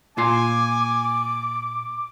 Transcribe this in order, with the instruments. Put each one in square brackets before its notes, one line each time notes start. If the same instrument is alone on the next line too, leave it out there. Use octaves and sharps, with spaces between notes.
[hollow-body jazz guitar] A#2 F4 C6 [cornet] G#5 [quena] D6